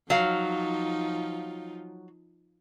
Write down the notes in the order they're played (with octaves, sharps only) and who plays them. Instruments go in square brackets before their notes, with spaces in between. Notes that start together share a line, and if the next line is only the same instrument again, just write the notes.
[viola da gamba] F3 D#4 F4 [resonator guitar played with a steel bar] F#3 F5